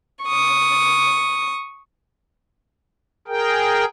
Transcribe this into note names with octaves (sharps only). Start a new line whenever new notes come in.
C#6 D#6
G#4 A#4 G5